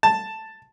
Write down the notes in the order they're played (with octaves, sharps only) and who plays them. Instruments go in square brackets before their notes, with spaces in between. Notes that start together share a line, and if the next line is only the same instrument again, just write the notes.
[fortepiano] A5